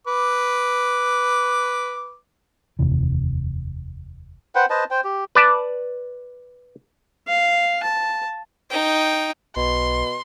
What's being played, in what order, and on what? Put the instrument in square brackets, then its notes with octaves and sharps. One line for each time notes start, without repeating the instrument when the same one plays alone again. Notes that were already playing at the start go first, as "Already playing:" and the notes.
[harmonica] B4 D6
[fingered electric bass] F1 D#2 C3 E3
[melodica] B4 C5 F#5 G5
B4 C5 D#5 A5
C5 G5
G4
[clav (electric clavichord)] B4 D5 A5
[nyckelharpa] F5
A5
[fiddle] D#4 G5
[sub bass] B1 [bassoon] B2 [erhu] C6